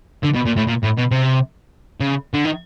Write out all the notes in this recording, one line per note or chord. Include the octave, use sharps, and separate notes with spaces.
D3
B2
A#2
A2
A#2
A2
B2
C3
C#3
D3
D#3